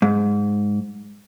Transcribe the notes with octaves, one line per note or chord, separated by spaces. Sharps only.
G#2